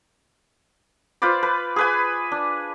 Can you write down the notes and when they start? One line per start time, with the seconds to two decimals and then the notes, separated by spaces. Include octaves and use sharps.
1.22 F4 B4 C5 D5
1.43 B4
1.76 G#4 B4 G#5
2.32 D4